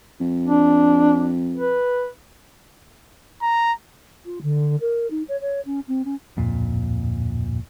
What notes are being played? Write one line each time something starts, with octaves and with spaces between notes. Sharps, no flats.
F2
D4
B4
A#5
F4
D3
A#4
D#4
C#5
C#5
C#4
C4
C#4
D1 F2 A#2